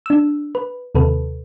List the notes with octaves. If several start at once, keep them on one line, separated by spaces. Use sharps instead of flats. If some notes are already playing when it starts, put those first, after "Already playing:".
D4 E6
B4
D#2 C3 A4 B4